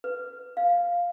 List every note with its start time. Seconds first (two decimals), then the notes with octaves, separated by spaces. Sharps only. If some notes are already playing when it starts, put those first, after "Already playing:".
0.04 B4
0.57 F5